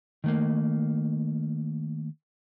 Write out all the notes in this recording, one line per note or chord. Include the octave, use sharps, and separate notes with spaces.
D#3 A3 A#3